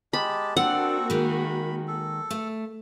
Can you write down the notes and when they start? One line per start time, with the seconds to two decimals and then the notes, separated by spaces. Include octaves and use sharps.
0.13 G#3 G4 A5 B5
0.57 A#3 C4 D4 F#4 A4 F#5
1.10 D#3 G#3 B5
1.88 A4
2.31 A3